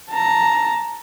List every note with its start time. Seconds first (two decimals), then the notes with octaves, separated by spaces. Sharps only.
0.10 A5 A#5